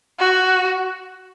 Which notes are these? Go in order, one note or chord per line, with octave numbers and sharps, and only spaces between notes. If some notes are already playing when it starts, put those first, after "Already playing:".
F#4